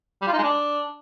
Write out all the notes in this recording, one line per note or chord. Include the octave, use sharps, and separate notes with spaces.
G3
F4
D#4
G#3
D4